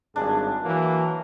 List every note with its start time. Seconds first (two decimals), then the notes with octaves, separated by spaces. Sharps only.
0.16 G#1 G2 D4 G#4
0.64 E3 F#3 A#3